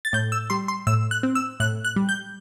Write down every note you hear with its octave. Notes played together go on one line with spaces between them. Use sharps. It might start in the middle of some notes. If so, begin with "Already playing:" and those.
A6
A2 G6
E6
G3 C6
C6
A2 E6
F#6
C4
E6
A2 F#6
F#6
G3
G6